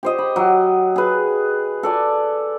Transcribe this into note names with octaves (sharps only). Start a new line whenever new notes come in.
G4 C5 D#5
B5
F#3
G#4 B4
A4 D5 G#5